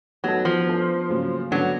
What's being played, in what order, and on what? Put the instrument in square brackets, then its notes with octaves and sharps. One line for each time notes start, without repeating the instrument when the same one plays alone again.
[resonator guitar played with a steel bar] F#3 [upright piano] G3 B3 D#4 F#4 A4
[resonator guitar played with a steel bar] F3
[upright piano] B3 D4 F4 A4 C5
C#3 F#3 A#3
[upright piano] D3 G3 B3 D4 [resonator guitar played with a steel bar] F#3